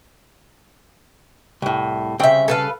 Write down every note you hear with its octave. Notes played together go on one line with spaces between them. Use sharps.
C2 A2
C2 C#3 C4 E5 G5
A4 B4 F5